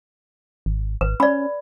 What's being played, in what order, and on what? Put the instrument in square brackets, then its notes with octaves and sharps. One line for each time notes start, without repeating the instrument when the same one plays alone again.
[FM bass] G#1
[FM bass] G#1 [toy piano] B4
[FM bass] C#4 [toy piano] D5 B5